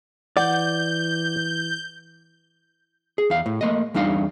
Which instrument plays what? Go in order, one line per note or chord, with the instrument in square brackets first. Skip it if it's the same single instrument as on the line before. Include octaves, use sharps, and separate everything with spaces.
[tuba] E3 [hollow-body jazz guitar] D5 [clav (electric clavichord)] F#5 [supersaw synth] G6
[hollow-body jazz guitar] G#4
E2 F5
A2
A3 A#3 D#5
E2 G3 D4 D#4 F5